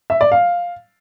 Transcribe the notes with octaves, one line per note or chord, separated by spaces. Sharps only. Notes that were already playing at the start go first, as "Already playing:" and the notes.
E5
D5
F5